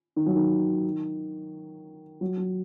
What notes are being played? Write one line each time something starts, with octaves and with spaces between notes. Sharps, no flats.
D#3
F#3
D#3
F#3
F#3